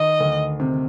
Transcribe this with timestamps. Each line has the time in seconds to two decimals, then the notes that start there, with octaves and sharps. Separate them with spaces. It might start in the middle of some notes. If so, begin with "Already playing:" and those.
Already playing: D#3 D#5
0.20 D2
0.60 C3